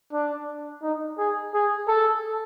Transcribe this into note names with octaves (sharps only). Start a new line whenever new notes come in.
D4
D#4
G#4
G#4
A4